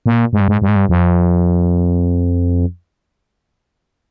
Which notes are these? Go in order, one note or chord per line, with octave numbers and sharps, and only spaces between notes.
A#2
G#2
G2
G#2
G2
G#2
G2
F2